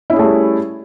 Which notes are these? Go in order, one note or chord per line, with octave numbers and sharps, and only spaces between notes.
G3 A3 C#4 E4 G#4